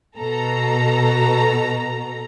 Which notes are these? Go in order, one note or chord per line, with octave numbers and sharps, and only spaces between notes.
B2 A4 A#5